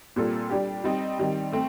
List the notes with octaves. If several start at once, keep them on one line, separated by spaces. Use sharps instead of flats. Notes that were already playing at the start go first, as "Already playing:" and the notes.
A#2 G3 C4 F4 A4
G3 D4 G4
G3 C4 D#4
D#3 G3 C4
A3 C4